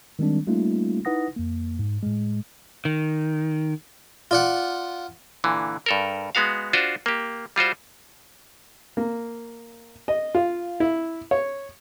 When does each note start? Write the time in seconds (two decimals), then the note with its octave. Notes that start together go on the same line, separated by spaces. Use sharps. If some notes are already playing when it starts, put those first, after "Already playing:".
0.19 D#3 G3 G#3 C4 D4
0.47 G3 A3 A#3 C#4 D#4 F4
1.05 D#4 E4 B4 F#5 D#6 A#6
1.37 F2 A#3
1.79 G#2
2.03 A2 G#3
2.85 D#3
4.31 F4 D5 F#5
5.44 A#2 D3 E3
5.86 G2 A4 A#4
6.35 G#3 B3 F#4 F5
6.73 D4 F4 F#4 C5
7.06 A#3 G4
7.56 G3 F4 F#4 C5
8.97 A#3
10.08 D#5
10.35 F4
10.80 E4
11.31 C#5